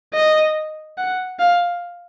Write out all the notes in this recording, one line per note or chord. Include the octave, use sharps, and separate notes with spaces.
D#5
F#5
F5